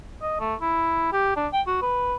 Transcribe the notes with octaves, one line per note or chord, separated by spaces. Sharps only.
D#5
A3
E4
G4
D4
G5
F#4
B4